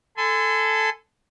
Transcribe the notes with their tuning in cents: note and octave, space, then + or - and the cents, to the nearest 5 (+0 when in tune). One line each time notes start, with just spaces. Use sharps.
A4 +0 G#5 +0 C6 -40